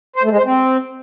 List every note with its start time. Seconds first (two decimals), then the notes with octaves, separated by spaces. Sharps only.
0.16 C5
0.23 A3
0.31 G#3
0.38 C5
0.45 C4